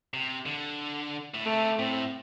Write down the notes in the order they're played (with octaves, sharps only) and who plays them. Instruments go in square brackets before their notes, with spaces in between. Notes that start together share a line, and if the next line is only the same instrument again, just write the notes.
[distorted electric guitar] C3
D3
A2
[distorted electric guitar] C3 [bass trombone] A3
[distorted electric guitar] A2 [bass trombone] C4